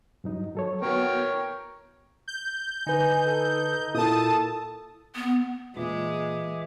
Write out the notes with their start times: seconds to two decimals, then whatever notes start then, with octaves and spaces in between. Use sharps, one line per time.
0.24 G2 F#3 D#4
0.55 F#3 A4 C#5
0.82 B3 F#4 A#4 C#5 G5
2.28 G6
2.87 D3 D#4 B4 G#5
3.25 A4
3.95 A#2 E4 A4 A#4 A5 D#6
5.16 B3
5.76 A#2 E3 G#3 E5 D6